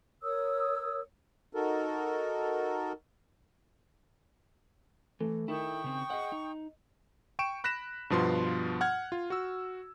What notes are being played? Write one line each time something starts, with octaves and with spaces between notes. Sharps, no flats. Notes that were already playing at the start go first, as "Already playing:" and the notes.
A#4 C#5 D#6 E6
D#4 F#4 A4 A#4
E3 A3
D#3 E4 A4 G5 C#6 D#6
C#3 C4
G#4 D#5 F#5
D#4
G5 C#6 D7 E7
B5 F#6 A#6 B6 E7
G2 B2 F3 B3 C6
F#5 F6 G#6
F4
F#4 E6